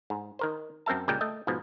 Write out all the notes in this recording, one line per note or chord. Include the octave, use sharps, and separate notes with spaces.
G#2
D#3 A#4 C5
F#2 C4 A#4 E5 A5
C#2 A#2 G3 G#3 G5
A3 D#5
G#2 B2 F3